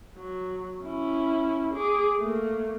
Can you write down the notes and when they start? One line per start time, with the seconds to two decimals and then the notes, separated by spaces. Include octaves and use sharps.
0.17 F#3
0.84 C#4 E4
1.74 G#4 D6
2.18 A3 A#3